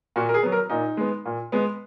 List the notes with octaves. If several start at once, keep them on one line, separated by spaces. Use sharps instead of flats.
A#2 F#4
A#4
G#4
F#3 B3
A#4
A#2 D#4
G#3 B3
A#2
G#3 B3